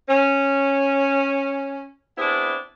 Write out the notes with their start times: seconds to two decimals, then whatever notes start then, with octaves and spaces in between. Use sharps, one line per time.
0.09 C#4
2.18 B3 C4 D4 E4 G#4